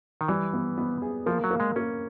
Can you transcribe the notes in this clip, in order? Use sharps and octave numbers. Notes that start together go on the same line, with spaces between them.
D#3
E3 G3
B3
B3
G#4
F3 A#3
F#3
A#3
G#3
A#3 C#4